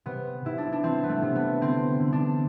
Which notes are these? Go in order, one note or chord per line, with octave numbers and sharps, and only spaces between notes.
C3 B3
C3 E4
D4
D4
E3 C4
B3
A3
C3
B3
D3 C4
D3
D4